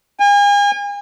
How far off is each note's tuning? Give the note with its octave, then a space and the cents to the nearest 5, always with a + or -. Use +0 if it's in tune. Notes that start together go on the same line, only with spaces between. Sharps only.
G#5 -40